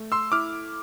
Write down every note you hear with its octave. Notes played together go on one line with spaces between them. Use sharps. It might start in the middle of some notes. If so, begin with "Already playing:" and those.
Already playing: A3
C6 E6
E4 D6 F6